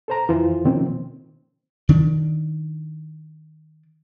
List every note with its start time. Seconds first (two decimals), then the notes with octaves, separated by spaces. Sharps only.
0.08 A4 C5 A#5
0.29 F2 E3 F4 C5
0.65 B2 D#3 F3 A#3 C4 C#4
1.89 D#3 D4